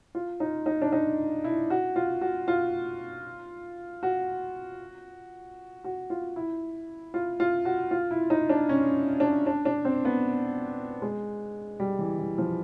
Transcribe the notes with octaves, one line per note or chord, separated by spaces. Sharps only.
F4
D#4
D#4
D4
D#4
E4
F#4
F4
F#4
F4
F#4
F#4
F4
E4
F4
F4
F#4
F4
E4
D#4
D4
C#4
D4
D4
D4
C4
B3
G#3
G3
E3
E3
F3